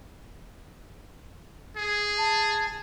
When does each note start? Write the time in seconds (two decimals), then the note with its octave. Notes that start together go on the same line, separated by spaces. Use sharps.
1.77 G#4
2.18 A5